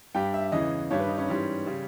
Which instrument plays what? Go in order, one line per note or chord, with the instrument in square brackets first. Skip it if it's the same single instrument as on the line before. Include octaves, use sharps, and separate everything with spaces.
[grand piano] G2 G3 G5
E5
E2 C#3 E3 D#5
G2 D#3 G3 C#5
B4
D#4
C#4
G#2 E3 G3
C#3 G3